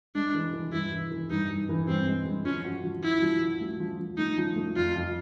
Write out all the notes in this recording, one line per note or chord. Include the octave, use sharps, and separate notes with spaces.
G#3 D4
E3
E3
G2 E4
E3
E3
G2 D#4
G2
E3
G2 C4
G#3
G2
F3 C#4
F#4
F3
E4 F#4
F3
F#4
A3
F3
F3
A3 D#4
F3
A3
F2 F4
F2